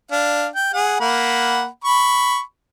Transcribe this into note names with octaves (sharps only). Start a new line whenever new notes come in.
D4 F5
G5
G#4 F#5
A#3 F#5 B5
B5 C#6